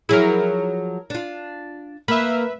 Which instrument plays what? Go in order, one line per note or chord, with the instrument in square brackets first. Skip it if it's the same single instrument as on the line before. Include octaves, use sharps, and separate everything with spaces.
[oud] F3 F#3 G#4 [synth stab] E4 A#4
[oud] D4 F4
[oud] A#3 [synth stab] B4 E5